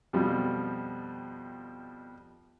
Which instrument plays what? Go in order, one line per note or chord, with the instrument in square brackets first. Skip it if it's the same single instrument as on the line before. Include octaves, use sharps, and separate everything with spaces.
[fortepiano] F2 B2 F3 G3